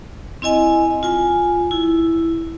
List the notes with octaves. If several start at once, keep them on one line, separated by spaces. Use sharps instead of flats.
C4 E4 D#5 G#5
F4 G#5
E4